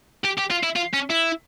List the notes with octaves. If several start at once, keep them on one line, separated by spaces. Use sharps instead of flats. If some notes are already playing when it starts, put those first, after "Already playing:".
G4
G4
F4
E4
F4
C#4
E4